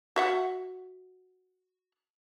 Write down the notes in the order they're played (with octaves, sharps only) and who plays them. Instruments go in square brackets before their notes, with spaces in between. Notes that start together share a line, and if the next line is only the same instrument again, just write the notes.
[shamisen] F#4 E5 F#5